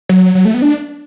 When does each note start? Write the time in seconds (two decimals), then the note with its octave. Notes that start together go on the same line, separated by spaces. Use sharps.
0.09 F#3
0.35 F#3
0.45 A3
0.54 B3
0.62 D4